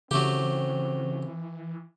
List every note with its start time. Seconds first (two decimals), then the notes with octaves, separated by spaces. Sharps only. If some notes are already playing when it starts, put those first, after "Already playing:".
0.11 C#3 E3 F#3 A3 C4 G4